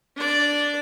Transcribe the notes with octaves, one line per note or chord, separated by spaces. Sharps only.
D4 D5